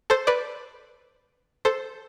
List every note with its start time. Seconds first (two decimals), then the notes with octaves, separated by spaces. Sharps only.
0.10 A4 C5
0.27 B4 D5
1.65 A4 C5